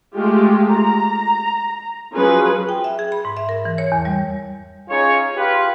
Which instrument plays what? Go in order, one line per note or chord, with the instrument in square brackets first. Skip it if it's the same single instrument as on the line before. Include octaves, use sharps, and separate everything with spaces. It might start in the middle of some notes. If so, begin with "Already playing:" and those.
[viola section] G#3 A3 F4 G4
A#5
F3 F#3 C#4 G#4 B4
[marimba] G5
E5
G#4
B5
G#2
E5
A#4
E3
C#5
E2
G3
[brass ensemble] C#4 D#4 F4 G#4 C#5
F4 G4 B4